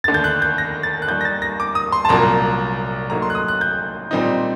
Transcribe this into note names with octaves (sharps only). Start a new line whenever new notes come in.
D#2 D3 A3 A6
G6
F#6
G6
A#6
A6
F#6
D#2 D#3 G3 G6
A#6
A6
A#6
D6
D#6
C6
A5
C2 A#2 F#3 A#3 A#5
A2 F#3 A#3 D#4 A#5
C6
F#6
D#6
F#6
G6
A#2 G3 C4 D#4